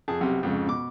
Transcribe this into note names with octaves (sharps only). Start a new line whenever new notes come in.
F2 G#4 A5
B1 C3
F2 G#2 C#3
B2 D6